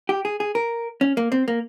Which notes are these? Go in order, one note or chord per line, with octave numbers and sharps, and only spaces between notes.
G4
G#4
G#4
A#4
C#4
A#3
C4
A#3